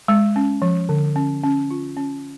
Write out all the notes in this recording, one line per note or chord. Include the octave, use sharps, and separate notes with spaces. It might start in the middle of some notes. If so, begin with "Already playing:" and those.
G#3
C#4
F3
D3
C#4
C#4
F4
C#4